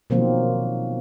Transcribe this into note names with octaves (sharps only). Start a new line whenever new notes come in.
B2 D#3 F3 F#3 A#3 C4